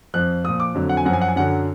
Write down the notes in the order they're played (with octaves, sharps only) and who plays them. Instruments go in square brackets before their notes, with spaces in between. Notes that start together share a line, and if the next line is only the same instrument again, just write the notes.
[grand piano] F2 F3 F#6
A#2 F3 D#6
D6
F2 D3 F#3
F#5
G#5
F#2 F#5
F3 G#5
F#5
G#5
F#2 D3 F#3 F#5